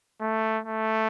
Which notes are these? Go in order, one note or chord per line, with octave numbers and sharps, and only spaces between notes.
A3
A3